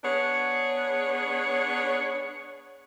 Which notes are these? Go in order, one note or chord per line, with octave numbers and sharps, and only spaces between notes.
B3 D4 G#4 C#5